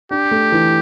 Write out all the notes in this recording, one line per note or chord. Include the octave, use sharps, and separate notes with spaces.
D4 G4
A3
E3